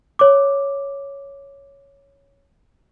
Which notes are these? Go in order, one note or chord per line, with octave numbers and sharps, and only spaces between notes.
C#5 D6